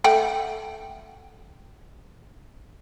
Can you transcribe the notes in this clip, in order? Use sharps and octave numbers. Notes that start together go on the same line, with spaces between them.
A3 F#5 G5